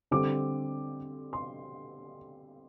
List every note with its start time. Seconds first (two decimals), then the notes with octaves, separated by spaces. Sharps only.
0.11 D3 G3 C4 D6
1.33 C6